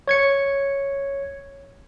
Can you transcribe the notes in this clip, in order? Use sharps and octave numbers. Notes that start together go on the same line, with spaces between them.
C#5 G#6 C#7